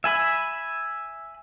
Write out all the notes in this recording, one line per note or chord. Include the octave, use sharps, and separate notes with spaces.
E5 G#5 B5